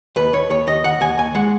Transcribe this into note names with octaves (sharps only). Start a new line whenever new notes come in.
D#2 B4
D#2 C#5
D#2 C#5
D#2 D#5
D#3 F#5
D#2 G#5
D#2 G#5
G#3 F#5